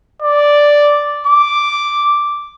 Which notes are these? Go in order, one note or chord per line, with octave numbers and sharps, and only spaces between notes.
D5
D6